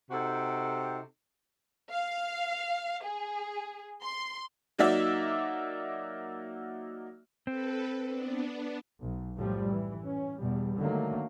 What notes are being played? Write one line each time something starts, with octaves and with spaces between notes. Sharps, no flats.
C3 D#4 F#4 A4 G5 A#5
F5
G#4
C6
F#3 A#3 D#4 F#4 D5 E5
C4 A4 B4
B3 D4
B1
F#2 A2 F3 G3
E3
C#4
E2 B2 G3
D3 D#3 F#3 A3 A#3